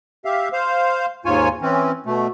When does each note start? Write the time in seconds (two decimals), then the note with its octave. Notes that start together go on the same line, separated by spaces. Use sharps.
0.25 G4 E5 F5
0.53 C5 F5
1.25 D#2 G#2 F4 C#5 G#5
1.62 E3 C4 C#4
2.06 B2 A3